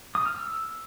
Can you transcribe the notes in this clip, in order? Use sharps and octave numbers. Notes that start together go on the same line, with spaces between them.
D#6
F6
E6